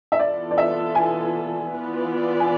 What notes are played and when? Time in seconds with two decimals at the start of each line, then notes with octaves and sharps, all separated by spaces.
0.12 E5
0.19 E3 B3 F4 A4 D5
0.51 D5
0.58 E5
0.95 G#5
1.70 E3 B3 F4 B4 D5
2.40 G#5